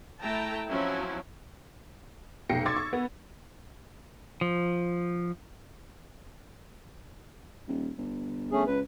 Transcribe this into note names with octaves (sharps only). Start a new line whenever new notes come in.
A3 E4 G5 A5 A#5
F3 F#3 C4 C#4 E4
F1 B1 G5 A#6 C7 C#7
C6 D6 E6 G#6 A6
C#6
B3
F3
D#1
G1
A3 C#4 G#4
C#2 B4